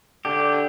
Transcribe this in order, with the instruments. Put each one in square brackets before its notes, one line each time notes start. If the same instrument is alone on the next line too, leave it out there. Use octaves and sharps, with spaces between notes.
[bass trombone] D3 [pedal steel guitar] G4